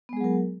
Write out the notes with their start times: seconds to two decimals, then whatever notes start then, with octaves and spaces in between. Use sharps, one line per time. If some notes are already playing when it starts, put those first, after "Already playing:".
0.09 B3
0.13 G#3
0.17 G#4
0.20 F#3
0.24 A#4